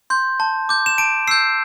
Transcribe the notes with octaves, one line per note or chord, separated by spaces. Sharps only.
C6 G6
A5
D6 G6
E7
A5 D7
E6 G6 C7